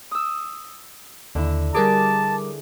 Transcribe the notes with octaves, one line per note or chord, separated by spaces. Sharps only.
D#6 E6
D#2 D3 E4
G3 G#4 A#4 A5 D6